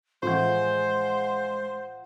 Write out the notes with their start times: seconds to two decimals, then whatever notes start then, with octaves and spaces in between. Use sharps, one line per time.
0.23 A2 E3 F3 G#3 C5 F#5